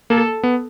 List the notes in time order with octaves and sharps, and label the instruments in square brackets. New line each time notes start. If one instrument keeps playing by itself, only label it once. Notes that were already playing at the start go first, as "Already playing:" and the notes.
[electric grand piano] A#3 [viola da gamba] A4
[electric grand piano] B3